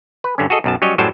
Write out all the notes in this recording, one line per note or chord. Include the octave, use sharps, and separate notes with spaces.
B4
G2 D3 C#4
F#4 G#4 A4 D#5
B1 F#2 A5
F#3 G3 C#4 C#5 D#5
F#2 A2 F#3 G3 C5 A5